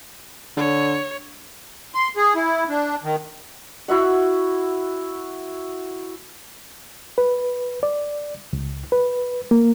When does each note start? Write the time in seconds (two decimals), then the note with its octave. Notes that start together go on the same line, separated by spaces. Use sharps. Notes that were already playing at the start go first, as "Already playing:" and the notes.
0.57 D3 C#5
1.95 C6
2.17 G#4
2.35 E4
2.69 D4
3.04 D#3
3.88 E4 F#4 E5 F#5
7.18 B4
7.83 D5
8.53 C#2
8.92 B4
9.51 A#3